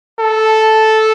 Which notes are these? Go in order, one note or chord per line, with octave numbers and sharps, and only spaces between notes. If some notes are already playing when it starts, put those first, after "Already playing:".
A4